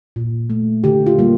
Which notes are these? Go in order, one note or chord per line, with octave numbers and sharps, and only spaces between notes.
A#2
A3
D3 G4
F4
G3 A#3